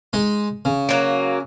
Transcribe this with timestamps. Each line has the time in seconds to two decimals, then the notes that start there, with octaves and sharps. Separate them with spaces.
0.13 G#3 D#4
0.65 C#3
0.89 F#3 A#3